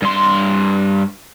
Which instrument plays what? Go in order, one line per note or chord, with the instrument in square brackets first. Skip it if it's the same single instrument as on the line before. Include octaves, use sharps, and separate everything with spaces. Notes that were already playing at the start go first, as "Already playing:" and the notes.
[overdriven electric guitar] G2 C6